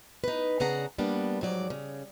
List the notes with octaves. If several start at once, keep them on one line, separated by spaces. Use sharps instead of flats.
D#4 B4
C#3 D4 G#4 F#5 A#5
G3 A#3 B3 D4
G#2 F3 F#3 D5
C#3